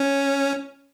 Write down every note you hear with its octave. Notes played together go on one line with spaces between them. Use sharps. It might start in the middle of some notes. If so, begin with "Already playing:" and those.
Already playing: C#4